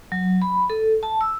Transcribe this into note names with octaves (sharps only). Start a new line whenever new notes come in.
F#3
B5
A4
A5
E6